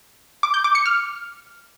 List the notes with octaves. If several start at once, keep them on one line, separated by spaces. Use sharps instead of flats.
D6
G6
D6
C#7
F6